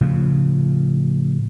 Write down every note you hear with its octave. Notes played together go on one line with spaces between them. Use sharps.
A2 C#3 F3